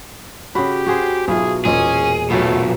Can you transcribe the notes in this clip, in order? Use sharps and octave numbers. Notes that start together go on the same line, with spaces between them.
C#3 F#4 G4 B5
F#4 G#4 C5
B1 B2 F4 G#4 E5
E1 A#2 C#4 G#4 D#5
B1 A#2 F#3 A3 B3